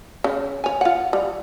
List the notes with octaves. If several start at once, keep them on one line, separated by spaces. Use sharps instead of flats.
C#3
C#5 G#5
F4 F#5
G3